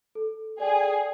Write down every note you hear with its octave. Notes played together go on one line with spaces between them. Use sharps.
A4
G#4 D5 G5